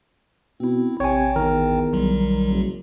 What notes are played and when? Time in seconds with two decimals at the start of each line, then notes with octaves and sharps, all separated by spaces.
0.60 B2 C4 E4
1.00 A1 C3 C#5 G5 G#5
1.36 E2 D#3 A#4
1.93 B1 F#3 G3
2.49 F#1